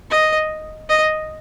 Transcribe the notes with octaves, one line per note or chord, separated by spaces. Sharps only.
D#5
D#5